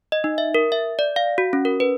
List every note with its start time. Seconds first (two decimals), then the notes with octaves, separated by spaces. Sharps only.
0.12 D#5
0.24 D#4
0.38 E5
0.55 A#4
0.72 E5
0.99 D5
1.16 F5
1.38 F#4
1.53 C#4
1.65 A#4
1.80 B4